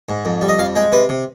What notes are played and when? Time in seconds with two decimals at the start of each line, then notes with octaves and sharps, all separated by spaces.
0.09 G#2
0.25 F2
0.41 G3
0.49 D#5
0.59 F2 F5
0.75 G#3 G5
0.92 C3 B4
1.09 C3